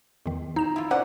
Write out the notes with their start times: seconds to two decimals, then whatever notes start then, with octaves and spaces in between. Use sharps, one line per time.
0.26 E2 D#3
0.56 D#4 A#5 E7
0.76 E4 F4
0.91 C#4 C5 D5 F#5